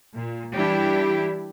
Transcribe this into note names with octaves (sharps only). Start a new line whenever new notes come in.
A#2
E3 G3 D4 E4 G4